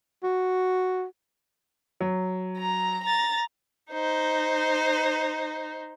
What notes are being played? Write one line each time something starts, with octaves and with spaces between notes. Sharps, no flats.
F#4
F#3
A#5
A#5 A6
D#4 C5